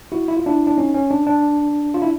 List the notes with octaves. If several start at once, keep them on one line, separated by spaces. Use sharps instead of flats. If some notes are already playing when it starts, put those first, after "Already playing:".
E4 F#4
E4
F4
D4 E4
D4
C#4 D#4
C#4
D4
D4
F4
E4